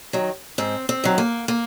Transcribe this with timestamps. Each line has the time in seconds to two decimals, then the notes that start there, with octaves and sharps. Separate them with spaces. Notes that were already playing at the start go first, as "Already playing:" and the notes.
0.13 D#3 F#3
0.58 G#2 C4
0.89 C4
1.04 D#3 F#3
1.18 A#3
1.48 A#3